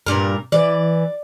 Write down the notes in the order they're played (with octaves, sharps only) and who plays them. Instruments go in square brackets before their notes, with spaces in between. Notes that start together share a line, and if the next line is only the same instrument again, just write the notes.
[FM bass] G2 [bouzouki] A#2 A#4
[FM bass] E3 [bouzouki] D5